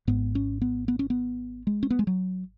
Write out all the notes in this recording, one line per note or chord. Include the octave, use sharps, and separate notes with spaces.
G#1 G#2 B3
C#4
B3
B3
C#4
B3
G#3
C#4
B3
G#3
F#3